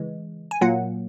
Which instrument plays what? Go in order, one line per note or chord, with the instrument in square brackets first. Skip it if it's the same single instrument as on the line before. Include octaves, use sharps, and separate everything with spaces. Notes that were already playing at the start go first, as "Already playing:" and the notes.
Already playing: [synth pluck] C#3 E3 G#3
G#5
A#2 F#3 A#3 F#5